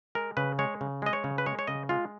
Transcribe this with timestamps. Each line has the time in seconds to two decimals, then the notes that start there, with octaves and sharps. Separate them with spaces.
0.15 G#3 A#4
0.37 C#3 B4
0.59 G#3 C#5
0.81 C#3
1.02 G#3 D#5
1.13 C#5
1.24 C#3
1.38 B4
1.46 G#3 C#5
1.59 C#5
1.67 C#3 D#5
1.89 G#3 F4